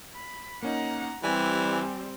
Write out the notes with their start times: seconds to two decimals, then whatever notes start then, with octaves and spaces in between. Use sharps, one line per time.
0.15 B5
0.63 A#3 C#4 D#4 F#5 A#5
1.23 E3 G3 C4 G4 D5 G#5